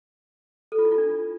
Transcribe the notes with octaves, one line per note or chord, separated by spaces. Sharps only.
A4
F4
E4
F4
D4